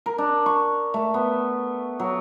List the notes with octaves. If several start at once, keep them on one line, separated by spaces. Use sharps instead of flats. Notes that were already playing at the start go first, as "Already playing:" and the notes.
A#4
D4
C#6
A3
B3
F#3